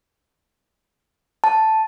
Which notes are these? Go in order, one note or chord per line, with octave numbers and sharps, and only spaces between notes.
A5